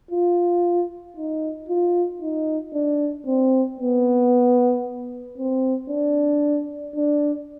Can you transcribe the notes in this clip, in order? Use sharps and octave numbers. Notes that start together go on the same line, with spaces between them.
F4
D#4
F4
D#4
D4
C4
B3
C4
D4
D4